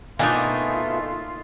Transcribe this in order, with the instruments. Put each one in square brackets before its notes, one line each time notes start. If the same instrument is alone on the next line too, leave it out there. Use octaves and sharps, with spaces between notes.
[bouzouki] B2 A3 G#5 [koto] A#3 D4 D#4 [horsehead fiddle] F4